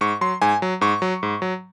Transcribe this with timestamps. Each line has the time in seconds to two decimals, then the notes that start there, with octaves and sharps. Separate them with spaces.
0.01 G#2 C#6
0.21 F#3 C6
0.42 G#2 G#5
0.62 F#3
0.81 G#2 C#6
1.02 F#3
1.23 G#2
1.42 F#3